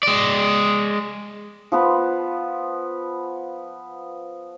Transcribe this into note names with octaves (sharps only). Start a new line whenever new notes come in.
G#3 D5
F3 B3 B4